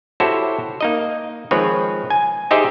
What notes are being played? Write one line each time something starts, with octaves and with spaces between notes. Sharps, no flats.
E4 F#4 G4 A4 C5 C#5
A#3 D#4 D#5
D#3 F3 G#3 C4 B4 C#5
G#5
D#4 G4 G#4 C5 D#5 E5